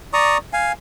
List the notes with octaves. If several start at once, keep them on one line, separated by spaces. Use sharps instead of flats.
D5 A#5 C#6 D#6
F5 G#5